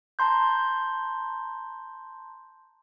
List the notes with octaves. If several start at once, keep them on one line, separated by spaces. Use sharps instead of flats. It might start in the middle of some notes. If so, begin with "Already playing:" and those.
A5 A#5 C6 G6